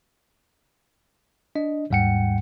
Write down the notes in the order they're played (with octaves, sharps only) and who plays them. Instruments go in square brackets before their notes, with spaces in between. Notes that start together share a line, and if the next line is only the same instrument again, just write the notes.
[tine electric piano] D4 D#5
D#2 G#2 G3 F#5 G5 C#7